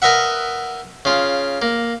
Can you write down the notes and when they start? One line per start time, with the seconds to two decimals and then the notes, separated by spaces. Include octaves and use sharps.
0.02 A#4 B4 D#5 E5 F#5
1.05 C#3 F4
1.62 A#3